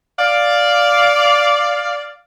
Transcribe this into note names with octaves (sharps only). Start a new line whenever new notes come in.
D5 F5